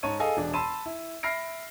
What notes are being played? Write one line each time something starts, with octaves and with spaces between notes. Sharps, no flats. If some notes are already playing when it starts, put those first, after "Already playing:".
G#2 C#5 A5 D#7
G#4 A4 D#5 F5 G#5
E1 D4
A5 B5 C6 E6 D#7 E7
E4
E5 B5 F6 A#6 C7 D7